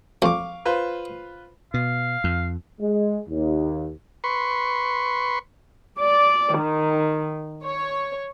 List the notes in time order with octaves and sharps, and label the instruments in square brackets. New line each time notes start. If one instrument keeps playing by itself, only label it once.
[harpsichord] F2 [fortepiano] F5 C#6 D6
[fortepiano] F4 B4 C5
[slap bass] B2 [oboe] F5
[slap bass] F2
[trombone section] G#3
D#2
[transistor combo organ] B4 C6 C#6
[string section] D5
D#3
C#5